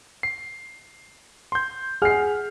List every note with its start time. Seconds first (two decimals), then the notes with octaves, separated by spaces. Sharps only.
0.23 C7
1.52 C6 G6
2.02 G#4 F#5 F6 C7